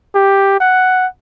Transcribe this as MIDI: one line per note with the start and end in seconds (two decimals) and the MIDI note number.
0.15 0.58 67
0.60 1.07 78